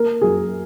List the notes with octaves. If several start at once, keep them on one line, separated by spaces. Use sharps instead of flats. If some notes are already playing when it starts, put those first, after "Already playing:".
Already playing: A#3 A#4
F#2 G#4